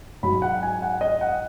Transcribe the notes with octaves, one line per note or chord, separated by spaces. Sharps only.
G#2 F#3 B5
F#5
G#5
F#5
D#5
F#5